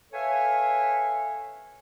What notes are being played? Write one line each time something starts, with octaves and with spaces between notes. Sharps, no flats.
A4 B4 C#5 E5 F5 G#5